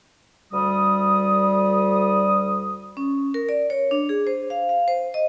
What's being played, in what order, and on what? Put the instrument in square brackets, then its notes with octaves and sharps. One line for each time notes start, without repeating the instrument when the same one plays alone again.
[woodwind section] D2 G3 D#6
[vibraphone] C#4
A#4
D5
C#5
D4
G#4
C5
F5
F5
C5
D#5